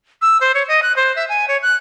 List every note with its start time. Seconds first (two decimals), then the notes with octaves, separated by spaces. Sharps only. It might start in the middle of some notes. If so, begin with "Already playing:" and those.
0.22 E6
0.41 C5
0.54 C#5
0.68 D#5
0.82 F#6
0.96 C5
1.16 E5
1.29 G#5
1.48 C#5
1.62 F#6